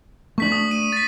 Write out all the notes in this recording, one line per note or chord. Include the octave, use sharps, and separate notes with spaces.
A3 D4 C#6 B6 F#7
D#6
D#7
A6 B6